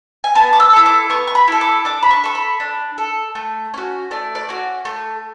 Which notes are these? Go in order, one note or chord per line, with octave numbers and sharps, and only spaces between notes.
G#5
B3 A5
D6
E6
E4 A4
D6
B3 C#6
C#6
B5
E4 A4
D6
D4 D6
B5
C#6
A4 C#6
B5
D4
A4
A3
C#4 F#4
A3 D5
D5
C#4 F#4
A3